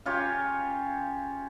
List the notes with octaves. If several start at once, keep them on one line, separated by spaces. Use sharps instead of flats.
C#3 F4 G4 C#5